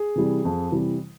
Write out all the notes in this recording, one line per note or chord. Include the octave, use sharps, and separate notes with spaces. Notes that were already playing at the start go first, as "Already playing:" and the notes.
Already playing: G#4
C3 E3 G3
F2
C3 E3 G3